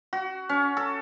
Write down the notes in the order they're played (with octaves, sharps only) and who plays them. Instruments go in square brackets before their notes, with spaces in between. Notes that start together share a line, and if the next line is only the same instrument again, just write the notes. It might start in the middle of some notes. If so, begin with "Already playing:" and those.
[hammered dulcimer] F#4
C#4
A4